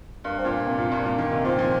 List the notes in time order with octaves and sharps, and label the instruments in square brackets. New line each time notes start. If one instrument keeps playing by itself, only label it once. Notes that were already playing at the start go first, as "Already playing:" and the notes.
[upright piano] G2 [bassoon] A#3
[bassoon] C4
[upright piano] A#2
[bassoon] A#3
[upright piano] C3
A#2
G2
A#2
D#3
C3
[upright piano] A#2 [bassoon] C4
[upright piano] F3